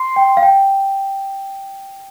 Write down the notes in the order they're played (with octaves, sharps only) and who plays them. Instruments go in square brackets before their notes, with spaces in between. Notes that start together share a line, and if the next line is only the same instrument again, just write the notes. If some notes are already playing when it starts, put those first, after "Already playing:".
Already playing: [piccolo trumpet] C6
[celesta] G5
F5
G5